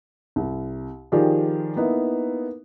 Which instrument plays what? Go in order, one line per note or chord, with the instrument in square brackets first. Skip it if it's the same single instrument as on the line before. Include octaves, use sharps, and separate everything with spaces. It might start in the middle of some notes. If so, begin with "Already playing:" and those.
[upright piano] C2
D#3 F3 F4 G4 G#4 D5
A#3 B3 D#4 E4